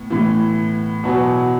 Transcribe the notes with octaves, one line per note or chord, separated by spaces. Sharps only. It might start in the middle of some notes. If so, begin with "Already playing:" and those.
Already playing: A2 B3
A2 E3
E2 B2 F#3 B3